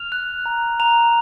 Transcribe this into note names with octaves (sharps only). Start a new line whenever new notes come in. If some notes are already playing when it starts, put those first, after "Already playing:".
Already playing: F6 F7
F#6
A#5
A#5 F7